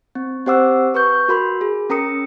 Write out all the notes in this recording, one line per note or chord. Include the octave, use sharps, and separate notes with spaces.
C4
C4 G4 C5 F#5 D6 E6
B4 C#6 G6
F#4 A#4 B5 C6
G#4
C#4 A#4 A#5 D#6 C#7